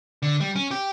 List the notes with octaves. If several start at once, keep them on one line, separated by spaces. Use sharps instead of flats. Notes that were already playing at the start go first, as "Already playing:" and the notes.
D3
G3
C#4
G4